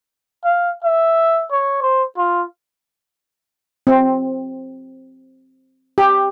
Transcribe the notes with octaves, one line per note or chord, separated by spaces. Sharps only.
F5
E5
C#5
C5
F4
C4
G4